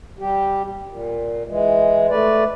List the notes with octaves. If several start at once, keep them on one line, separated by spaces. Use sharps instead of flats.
G3 G4
A#2
E3 G#3
A3 B4 D5